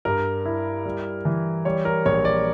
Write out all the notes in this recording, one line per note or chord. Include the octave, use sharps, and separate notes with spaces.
G2 A#4
E4
G3
E3
G3 C#5
A#4
A#1 C#5
D5